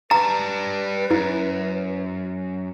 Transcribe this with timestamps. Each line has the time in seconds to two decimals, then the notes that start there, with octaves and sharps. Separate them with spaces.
0.11 G3 B4 A5 A#5
1.11 F#2 E4